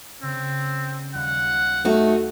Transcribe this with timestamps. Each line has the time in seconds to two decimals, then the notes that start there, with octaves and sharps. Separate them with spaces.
0.22 C#3 C4
1.14 D#2 G3 F#5
1.85 A3 D#4 F#4